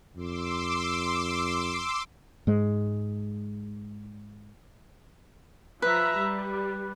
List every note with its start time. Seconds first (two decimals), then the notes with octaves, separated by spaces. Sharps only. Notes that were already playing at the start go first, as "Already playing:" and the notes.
0.17 F2 C6 D6 E6
2.47 G#2 G#3
5.82 F3 B4 E5 A#5
6.17 G3